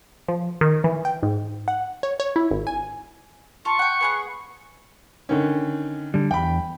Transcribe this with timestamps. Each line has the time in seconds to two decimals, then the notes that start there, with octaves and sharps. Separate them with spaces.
0.28 F3
0.61 D#3
0.84 E3
1.05 G5
1.23 G#2
1.68 F#5
2.03 C#5
2.20 C#5
2.36 E4
2.51 G#1
2.67 G#5
3.65 F4 A5 C#6
3.79 F#5 G5
4.01 B3 G#4 F#5
5.29 D3 D#3 C#4
6.14 D3 G3
6.31 E2 G5 B5